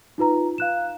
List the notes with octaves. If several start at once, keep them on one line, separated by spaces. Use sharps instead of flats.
D#4 F4 B4 A#5
F5 F#6 E7